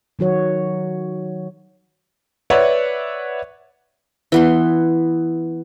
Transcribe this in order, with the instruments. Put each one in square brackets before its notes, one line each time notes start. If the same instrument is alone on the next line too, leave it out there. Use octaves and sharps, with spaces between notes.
[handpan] D#3 F#3 F#4 C#5
[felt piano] B4 C#5 D5 E5 F#5
[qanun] E3 B3 C6